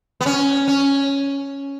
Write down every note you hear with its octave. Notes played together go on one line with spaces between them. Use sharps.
B3
C#4
C#4